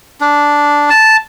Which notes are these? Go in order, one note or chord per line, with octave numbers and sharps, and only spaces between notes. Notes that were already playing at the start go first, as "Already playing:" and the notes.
D4
A5